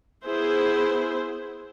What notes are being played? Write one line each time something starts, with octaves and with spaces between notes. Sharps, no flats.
B3 E4 G#4 C5